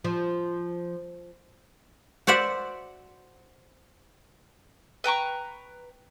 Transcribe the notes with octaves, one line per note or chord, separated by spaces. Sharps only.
F3
F#4 C5 D5 E5 F#5
B4 G5 A#5 C#6